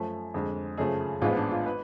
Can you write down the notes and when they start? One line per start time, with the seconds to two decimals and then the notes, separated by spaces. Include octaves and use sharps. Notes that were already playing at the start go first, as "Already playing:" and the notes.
Already playing: F#2 F3 A3
0.34 F2 D3 G#3
0.77 F#2 C#3 F3 A3 G#4
1.21 A1 G#2 F3 G#3 B3 F4
1.37 D4
1.52 F4
1.66 B4